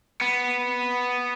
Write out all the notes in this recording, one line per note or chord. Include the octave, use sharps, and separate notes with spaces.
B3